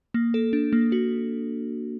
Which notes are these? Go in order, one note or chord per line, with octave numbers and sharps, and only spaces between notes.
A#3
A4
D4
A#3
F#4